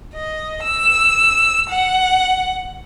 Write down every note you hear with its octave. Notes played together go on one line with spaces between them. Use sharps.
D#5
E6
F#5